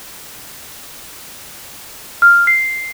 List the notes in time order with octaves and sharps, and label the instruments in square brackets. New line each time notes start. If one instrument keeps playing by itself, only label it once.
[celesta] F6
C7